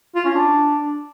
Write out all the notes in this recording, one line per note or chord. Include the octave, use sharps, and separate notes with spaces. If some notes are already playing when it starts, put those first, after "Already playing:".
F4
C#4
D4